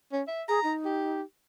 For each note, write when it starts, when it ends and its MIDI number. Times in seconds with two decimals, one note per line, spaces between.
0.12 0.22 61
0.28 0.43 76
0.48 0.60 68
0.48 0.73 82
0.64 1.21 63
0.85 1.22 67